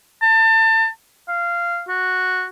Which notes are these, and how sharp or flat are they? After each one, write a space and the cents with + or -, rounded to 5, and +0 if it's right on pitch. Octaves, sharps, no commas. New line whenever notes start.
A5 +30
F5 -15
F#4 -5